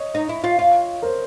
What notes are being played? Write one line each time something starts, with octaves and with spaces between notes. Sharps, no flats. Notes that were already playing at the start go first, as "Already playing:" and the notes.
Already playing: C#5 D#5
D#4
E4
F4
F4
A#4 C5